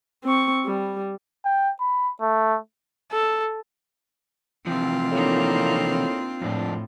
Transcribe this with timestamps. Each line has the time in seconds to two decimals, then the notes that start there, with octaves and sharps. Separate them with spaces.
0.24 C4 C#6
0.65 G3
1.45 G5
1.80 B5
2.21 A3
3.12 A4
4.67 C3 E3 F3 C4 F4
5.12 A2 A#3 D4 D#4
6.41 F2 A2 D4